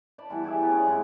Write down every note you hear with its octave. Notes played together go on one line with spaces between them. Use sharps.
D5 A5 B5
E3 G3 B3
G4 G#4 D5 E5
F#3 B3
C#4 D5 E5
G#2 B3 C4 E4